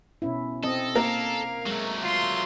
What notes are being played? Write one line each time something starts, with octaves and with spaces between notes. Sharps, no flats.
B2 C#4 E4
C4 A4 D#5
A#3 A#4 F5
F#3 G#3 A3
F4 C6